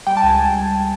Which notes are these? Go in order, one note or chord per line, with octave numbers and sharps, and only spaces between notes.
G3 G5
A5
C#2
G#5